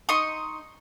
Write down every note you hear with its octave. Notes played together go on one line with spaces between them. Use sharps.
D#4 C6 C#6 D#6